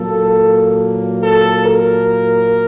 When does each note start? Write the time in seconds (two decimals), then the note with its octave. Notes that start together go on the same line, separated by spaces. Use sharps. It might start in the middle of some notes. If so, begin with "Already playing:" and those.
Already playing: A#2 F#3 A#3 A4
1.23 A4
1.65 A#4